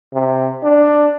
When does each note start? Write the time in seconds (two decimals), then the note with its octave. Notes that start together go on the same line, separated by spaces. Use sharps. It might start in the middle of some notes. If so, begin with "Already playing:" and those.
0.14 C3
0.63 D4